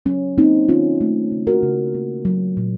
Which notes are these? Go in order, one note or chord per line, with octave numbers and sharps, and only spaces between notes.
F#3 C#4
A#3 C4 D#4
D#3 C#4 F4
A3
C#3
F#4 A#4
C#3
A#3
F#3
A#2